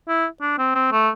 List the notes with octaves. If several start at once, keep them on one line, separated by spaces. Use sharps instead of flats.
E4
D4
C4
C4
A3